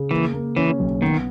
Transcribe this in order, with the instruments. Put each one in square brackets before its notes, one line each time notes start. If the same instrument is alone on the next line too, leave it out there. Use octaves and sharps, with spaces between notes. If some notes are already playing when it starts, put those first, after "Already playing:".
Already playing: [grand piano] C#3
[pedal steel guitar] E3 [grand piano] A#3
[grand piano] A#3
[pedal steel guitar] E3 [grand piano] C#4
[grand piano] B1
[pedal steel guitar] D#3 [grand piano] B3